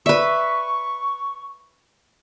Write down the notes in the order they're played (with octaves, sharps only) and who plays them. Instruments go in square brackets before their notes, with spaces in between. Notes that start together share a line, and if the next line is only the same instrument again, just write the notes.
[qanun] B4 E5 [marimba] D5 [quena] C#6